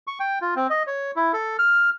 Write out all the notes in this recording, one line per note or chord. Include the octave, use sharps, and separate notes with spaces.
C#6
G5
F4
C4
D#5
C#5
E4
A4
F6